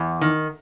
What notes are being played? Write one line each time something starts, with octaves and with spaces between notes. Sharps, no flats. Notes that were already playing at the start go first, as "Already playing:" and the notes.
Already playing: E2
D#3